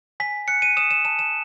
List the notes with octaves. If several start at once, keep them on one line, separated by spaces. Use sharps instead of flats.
G#5 B6
F#6 C#7
D#7
D#6 E7
E7
A5 E7
E7